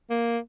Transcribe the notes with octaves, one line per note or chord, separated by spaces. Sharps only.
A#3